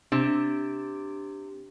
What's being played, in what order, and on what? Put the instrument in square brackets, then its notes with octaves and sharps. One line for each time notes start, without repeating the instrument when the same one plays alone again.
[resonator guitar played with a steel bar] C3 [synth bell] D4